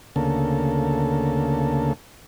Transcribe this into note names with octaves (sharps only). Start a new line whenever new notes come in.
D2 C#3 A#3 A4